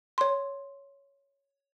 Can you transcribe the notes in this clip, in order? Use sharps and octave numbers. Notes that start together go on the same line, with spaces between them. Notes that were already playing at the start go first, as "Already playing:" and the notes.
C#5 C6